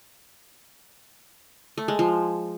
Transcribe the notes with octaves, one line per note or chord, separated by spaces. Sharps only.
A3
G#3
F3